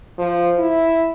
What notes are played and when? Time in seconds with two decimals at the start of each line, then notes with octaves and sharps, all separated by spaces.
0.18 F3
0.59 E4